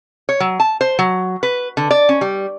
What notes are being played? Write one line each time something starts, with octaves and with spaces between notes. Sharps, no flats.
C#5
F#3
A5
C5
F#3
B4
D3
D5
C#4
G3